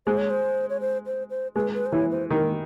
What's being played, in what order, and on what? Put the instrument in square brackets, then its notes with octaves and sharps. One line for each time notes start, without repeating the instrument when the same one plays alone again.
[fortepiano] G#3 [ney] C5
[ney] C#5
C5
C#5
C5
C5
C5
[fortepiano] G#3 [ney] B4
[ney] B4
C5
[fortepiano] E3 [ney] C#5
[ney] C5
[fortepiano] D#3 [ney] A#4